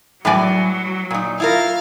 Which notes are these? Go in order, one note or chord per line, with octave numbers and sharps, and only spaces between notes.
A2 F#3 G3 B4 D5 G#5
A#2 D#4
E4 F4 A#4 F5